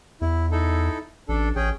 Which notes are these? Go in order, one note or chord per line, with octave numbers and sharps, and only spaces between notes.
E2 E4
D#4 E4 A4
A1 D4 A4
A1 C#4 G#4 G5